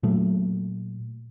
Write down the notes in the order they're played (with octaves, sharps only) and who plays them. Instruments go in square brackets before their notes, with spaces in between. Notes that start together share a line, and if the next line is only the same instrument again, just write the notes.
[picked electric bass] A#2 F#3 A3